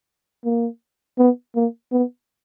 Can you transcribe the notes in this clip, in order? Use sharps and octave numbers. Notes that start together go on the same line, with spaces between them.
A#3
B3
A#3
B3